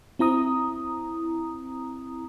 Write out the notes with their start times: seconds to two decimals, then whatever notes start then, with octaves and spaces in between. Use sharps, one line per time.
0.19 C4 E4 A#5 D#6